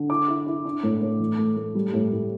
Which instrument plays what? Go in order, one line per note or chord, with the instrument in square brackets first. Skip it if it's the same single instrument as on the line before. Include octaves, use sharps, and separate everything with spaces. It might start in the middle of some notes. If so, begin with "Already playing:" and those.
Already playing: [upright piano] D3
E4 D6
E4
E4
D4
A2
A2
E3
A3
A3
G3
A2
A2